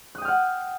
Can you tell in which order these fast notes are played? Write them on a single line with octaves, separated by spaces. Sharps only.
F#6 D#6 G5 F6 F#5